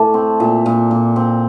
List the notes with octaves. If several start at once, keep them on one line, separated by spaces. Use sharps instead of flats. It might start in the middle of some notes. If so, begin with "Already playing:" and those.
Already playing: A2 A3 D5
C4
A#2
A#2
A#2
C4